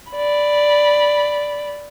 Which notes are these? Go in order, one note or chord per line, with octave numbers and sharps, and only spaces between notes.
D5 B5